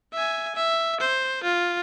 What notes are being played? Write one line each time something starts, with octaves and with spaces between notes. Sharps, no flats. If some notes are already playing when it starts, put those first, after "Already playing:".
E5 G#5
E5
C5
F4